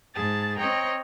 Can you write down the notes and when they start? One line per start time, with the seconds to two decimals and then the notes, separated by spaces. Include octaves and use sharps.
0.14 G#2 G#4 A5 A6
0.57 C4 C#5 D#5 G5 A#5